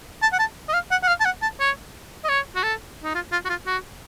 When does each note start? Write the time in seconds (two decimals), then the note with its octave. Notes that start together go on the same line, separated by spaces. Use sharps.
0.22 A5
0.33 F#5
0.39 A5
0.69 D#5
0.74 F5
0.91 F#5
1.03 F#5
1.08 F5
1.21 A5
1.25 F#5
1.42 A5
1.60 C#5
2.24 D#5
2.29 C#5
2.55 F#4
2.63 A4
3.03 D#4
3.15 F4
3.32 F4
3.45 F#4
3.49 F4
3.67 F#4